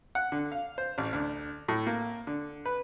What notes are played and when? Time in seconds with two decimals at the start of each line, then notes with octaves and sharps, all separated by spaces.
0.15 F#5
0.32 D3
0.52 F5
0.78 C5
0.98 A1
1.13 D2
1.68 A2
1.87 A#3
2.27 D3
2.65 B4